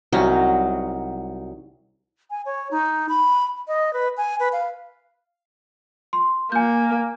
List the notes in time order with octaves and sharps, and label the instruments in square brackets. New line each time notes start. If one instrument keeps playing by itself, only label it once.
[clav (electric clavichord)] C2 C#4 [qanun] F#3 D#4
[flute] G#5
C#5
D#4
B5
D#5
B4
G#5
B4
F5
[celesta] C6
[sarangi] A#3 [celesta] G#5 G6